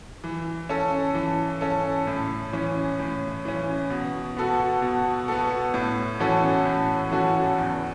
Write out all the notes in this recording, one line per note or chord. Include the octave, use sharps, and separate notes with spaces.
E3
C#4 A4
E3
C#4 A4
A2
E3 C#4
A2
E3 C#4
B2
B3 F#4 A4
B2
B3 F#4 A4
A2
E3 C#4 F#4 A4
A2
E3 C#4 F#4 A4
E2